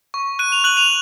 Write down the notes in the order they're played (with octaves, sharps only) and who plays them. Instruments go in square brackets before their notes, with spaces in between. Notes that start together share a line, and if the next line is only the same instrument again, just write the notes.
[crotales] C#6
F#6 D#7
F7
F#6 F#7
F7